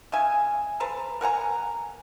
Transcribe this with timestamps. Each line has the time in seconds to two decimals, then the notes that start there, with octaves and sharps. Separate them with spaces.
0.12 C#3 E5 G#5
0.80 A4 B4 C5 A#5
1.21 A#4 F#5 G#5 A#5